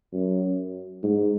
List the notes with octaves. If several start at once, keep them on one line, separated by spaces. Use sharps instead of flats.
F#2
G#2